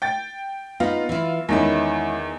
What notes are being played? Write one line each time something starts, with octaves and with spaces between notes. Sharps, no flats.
G5 A6
B3 D#4 F4
E3 E4
E2 D#3 G#3 C#4 E4